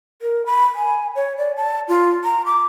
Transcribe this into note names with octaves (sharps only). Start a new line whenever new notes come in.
A#4
B5
G#5
C#5
D5
A5
F4
A#5
D6